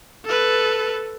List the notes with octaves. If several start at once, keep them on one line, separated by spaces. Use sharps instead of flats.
A4 B4